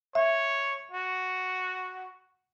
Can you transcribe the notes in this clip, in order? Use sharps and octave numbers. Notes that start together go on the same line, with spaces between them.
C#5 E5
F#4